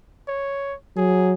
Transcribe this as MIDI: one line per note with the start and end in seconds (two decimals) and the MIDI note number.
0.28 0.75 73
0.97 1.34 54
0.97 1.34 68